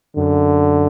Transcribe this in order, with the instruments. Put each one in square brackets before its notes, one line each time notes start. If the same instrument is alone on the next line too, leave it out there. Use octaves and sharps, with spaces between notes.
[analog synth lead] F#2 [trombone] D3